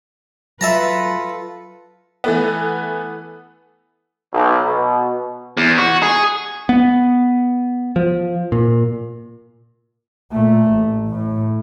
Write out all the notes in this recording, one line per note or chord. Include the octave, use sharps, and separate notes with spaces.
F#3 F4 A4 B4 E5 A5 A#5
E3 A3 B3
B1
B2
E2
F#4
G#4
B3
F3
A#2
A#2 A3
A1
A2